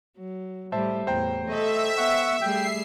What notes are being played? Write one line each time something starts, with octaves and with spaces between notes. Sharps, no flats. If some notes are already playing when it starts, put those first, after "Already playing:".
F#3
A2 G3 C5 E5 A5
E2 A2 C5 G5 A#5
A3 A4 D#5 E5
B3 F#5 C#6
G3 A3 G#4 G5 C7